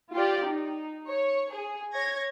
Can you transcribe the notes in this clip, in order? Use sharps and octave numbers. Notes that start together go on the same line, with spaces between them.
F4 G4 D5
D#4
C#5
G#4
C#5 G#6 A#6